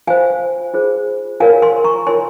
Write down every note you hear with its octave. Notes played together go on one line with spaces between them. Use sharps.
F4 C5 F5 G#5
F4 G#4 C5
F4 A#4 C#5 F5 G#5
G#5 C6
A#5 C#6
F4 A#4 C#5 G#5 C6